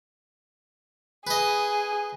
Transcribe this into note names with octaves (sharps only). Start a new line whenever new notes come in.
G#4 B4 D#5